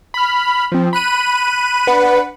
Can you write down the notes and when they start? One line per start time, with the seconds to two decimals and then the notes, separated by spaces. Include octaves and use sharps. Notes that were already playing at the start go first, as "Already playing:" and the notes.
0.14 B5 F6
0.72 F3 C4
0.93 B5 F#6 D#7
1.87 D4 B4 F#5 B5